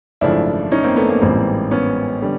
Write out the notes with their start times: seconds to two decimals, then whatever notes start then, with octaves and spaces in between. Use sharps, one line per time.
0.21 G#1 F#2 C#3 F3 A3 D4 E4
0.71 C#4 D#4
0.84 A#3 C4
0.96 A3 B3
1.09 A#3
1.21 A1 G#2 E3 G3 A#3 C4
1.71 B3 C#4
2.22 D3 G3